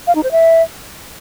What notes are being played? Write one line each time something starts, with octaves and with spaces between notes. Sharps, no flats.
F5
D#4
C5
E5